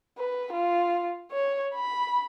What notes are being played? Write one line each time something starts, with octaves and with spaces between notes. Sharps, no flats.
B4
F4
C#5
B5